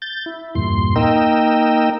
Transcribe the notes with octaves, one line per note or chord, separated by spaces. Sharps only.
G6 A6
E4
E2 G2 A#2 C6
A#3 D#4 A#4 D#5 G5 E6